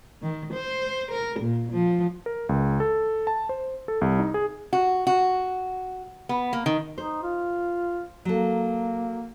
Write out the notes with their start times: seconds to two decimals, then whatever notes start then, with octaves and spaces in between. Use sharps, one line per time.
0.22 D#3
0.53 C5
1.11 A#4
1.40 A#2
1.72 F3
2.26 A#4
2.49 C#2
2.80 A4
3.27 A5
3.49 C5
3.88 A4
4.01 C2
4.19 D#4
4.34 G#4
4.73 F#4
5.07 F#4
6.29 B3
6.53 A#3
6.66 D#3
6.98 D#4 C5
7.23 F4
8.25 F#3 A#3 A4